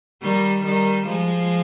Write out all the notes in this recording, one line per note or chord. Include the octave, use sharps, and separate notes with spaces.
D#3 G3
D#3 G3
F3 G#3